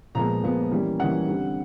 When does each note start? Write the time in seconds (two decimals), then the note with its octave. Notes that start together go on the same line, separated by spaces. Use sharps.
0.15 A#2 F3 G#3 B3 A#5
0.44 A#2 F3 G#3 B3
0.71 E3 G3 A#3 C#4
1.00 E3 G3 A#3 C#4 F#5
1.28 D3 G3 C4